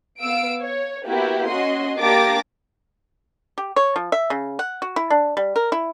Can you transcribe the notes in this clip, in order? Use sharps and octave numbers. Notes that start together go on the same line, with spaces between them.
B3 F5 E6 D7
C#5
A#3 B3 E4 F#4 G4
C#4 F#4 D#5 C6
A#3 D4 G4 D6 A6 A#6
G4
C#5
F3
E5
C#3
F#5
F#4
E4
D4
G3
A#4
E4